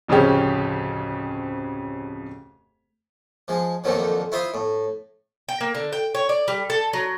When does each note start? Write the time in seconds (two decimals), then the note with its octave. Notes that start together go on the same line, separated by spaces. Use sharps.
0.08 D1 F2 C#3 C4 C#4 G4
3.48 F3 G#3
3.84 F2 A#2 D3 D#3 F3 F#3
4.32 E4 F4 C5 E5 D#6
4.54 A2
5.49 G5
5.61 A#3
5.75 D3
5.93 G5
6.15 C#5
6.29 D5
6.48 G3
6.70 A4
6.93 F#3